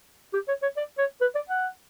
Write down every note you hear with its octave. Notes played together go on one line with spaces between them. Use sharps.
G4
C#5
C#5
D5
C#5
B4
D5
F#5